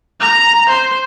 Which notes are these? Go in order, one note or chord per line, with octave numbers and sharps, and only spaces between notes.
A#5
C5